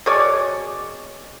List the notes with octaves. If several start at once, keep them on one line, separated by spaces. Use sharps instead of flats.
B2 G#4 C#5 D5